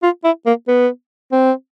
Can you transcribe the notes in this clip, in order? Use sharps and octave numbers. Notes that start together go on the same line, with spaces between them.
F4
E4
A#3
B3
C4